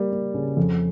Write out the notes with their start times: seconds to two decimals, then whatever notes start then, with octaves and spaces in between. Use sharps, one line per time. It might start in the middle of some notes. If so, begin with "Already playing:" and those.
Already playing: G3 A#3
0.12 A#3
0.34 C#3
0.57 F2